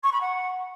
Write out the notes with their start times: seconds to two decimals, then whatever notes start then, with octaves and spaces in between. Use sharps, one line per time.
0.03 C#6
0.12 B5
0.20 F#5